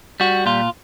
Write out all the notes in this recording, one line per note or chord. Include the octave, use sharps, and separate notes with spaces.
G3 F#4
A#2 F4